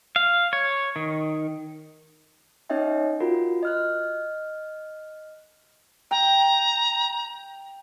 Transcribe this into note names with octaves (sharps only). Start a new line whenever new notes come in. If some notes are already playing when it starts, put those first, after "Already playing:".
F5
C#5
D#3
C#4 D#4 C#5 D#5 E5 G5
F4 F#4 A#4
D#5 F6 F#6
G5 A#5